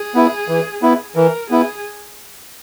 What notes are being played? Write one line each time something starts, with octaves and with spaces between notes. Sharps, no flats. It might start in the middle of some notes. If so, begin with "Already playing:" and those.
Already playing: G#4
B3 E4
E3
B3 E4
E3 A#4
B3 E4 G#4